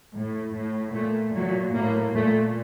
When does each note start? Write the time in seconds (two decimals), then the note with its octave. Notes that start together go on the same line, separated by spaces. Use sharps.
0.16 A2
0.56 A2
0.95 A#2 A3
1.35 A#2 F#3
1.75 A2 A#3
2.15 A#2 A3